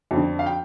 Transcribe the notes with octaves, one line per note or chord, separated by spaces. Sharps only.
F2
D3
F5
G5